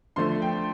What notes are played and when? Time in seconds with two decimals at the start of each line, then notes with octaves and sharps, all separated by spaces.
0.16 D3 F3 A3 C6
0.42 G5